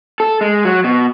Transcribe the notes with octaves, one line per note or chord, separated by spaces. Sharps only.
A4
G#3
F#3
B2